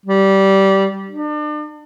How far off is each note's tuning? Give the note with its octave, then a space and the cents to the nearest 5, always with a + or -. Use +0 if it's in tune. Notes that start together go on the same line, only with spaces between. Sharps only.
G3 -15
D4 +40